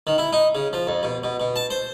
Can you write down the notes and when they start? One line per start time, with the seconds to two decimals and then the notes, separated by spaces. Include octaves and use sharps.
0.07 D#3
0.18 E4
0.33 D#4
0.55 C#3
0.73 F3
0.87 F2
1.03 B2
1.24 B2
1.40 B2
1.56 A5
1.70 C5